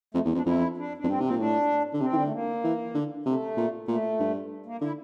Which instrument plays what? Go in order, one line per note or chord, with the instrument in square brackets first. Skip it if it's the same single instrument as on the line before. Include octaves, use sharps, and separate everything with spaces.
[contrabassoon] F2 [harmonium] A3
[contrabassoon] E2
[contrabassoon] F2 [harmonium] D4
[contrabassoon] F2 [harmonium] E4
[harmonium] D4
D4
[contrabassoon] F2
[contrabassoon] G2 [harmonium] C4
[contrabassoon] C3 [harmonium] C4
[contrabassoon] A#2
[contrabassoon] A2 [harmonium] D4
[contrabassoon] D3
[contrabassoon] C3 [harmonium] C4
[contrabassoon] E3
[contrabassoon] D3 [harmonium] G3
[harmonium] A3
A#3
[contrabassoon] E3
D3
[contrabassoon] C3 [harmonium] A3
[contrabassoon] A#2
[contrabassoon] A#2 [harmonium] A3
[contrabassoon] G2
[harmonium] A#3
[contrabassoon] D3 [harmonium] E4